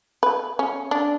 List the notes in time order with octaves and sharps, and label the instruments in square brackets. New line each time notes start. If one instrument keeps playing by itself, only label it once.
[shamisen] B4
C#4
D4